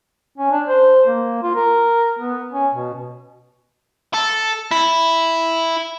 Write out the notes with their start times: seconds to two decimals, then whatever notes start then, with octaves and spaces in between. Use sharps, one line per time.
0.38 C#4
0.52 D4
0.68 C5
1.07 A#3
1.42 F4
1.55 A#4
2.19 B3
2.52 C#4
2.74 B2
4.14 A4
4.71 E4